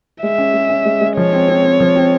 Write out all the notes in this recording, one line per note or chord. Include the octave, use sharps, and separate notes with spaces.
G#3 E5
C#4
G#3
C#4
G#3
G#3
F3 C#5
C4
C4
C4
F3
C4